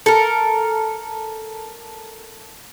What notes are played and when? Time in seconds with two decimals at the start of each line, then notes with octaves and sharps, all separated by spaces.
0.06 A4 A#4